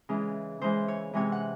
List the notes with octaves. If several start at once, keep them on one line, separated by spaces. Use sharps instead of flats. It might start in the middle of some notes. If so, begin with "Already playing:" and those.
C#3 E3 G#3
C#3 E3 G#3 C5
C#5
C3 E3 G#3 C#5
F#5